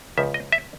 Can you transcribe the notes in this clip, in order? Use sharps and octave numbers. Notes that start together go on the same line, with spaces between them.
C#2 C#3 F3 E5
D#5
E5